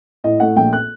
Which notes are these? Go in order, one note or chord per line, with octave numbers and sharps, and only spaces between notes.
A2 D#5
A3 F#5
A#1 G5
F#6